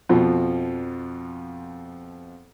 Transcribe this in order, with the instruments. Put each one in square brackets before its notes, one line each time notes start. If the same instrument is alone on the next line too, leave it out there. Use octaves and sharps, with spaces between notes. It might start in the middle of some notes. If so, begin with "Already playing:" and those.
[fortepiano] F2 B2 F3